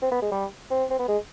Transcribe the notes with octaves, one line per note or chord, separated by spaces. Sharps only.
C4
B3
G#3
G3
C4
C4
B3
G#3